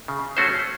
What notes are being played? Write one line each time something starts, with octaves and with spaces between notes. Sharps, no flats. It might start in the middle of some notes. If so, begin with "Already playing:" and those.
C#3
A3 C#4 F#4 C5